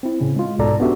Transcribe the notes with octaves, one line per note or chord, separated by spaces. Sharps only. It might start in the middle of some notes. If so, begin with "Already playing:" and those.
C4 E4
A2 C#3 C#4
G#3 F4
B1 G#2 B2 A4 D5 A#5
B3 C#4 D4 F#4 G4 E5